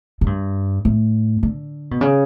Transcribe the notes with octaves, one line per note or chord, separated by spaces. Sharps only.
A2
G2
A2
D3
B2
C#3